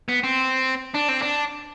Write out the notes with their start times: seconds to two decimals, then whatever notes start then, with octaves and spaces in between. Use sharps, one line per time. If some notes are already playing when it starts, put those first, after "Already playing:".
0.09 B3
0.24 C4
0.95 D4
1.09 C4
1.22 D4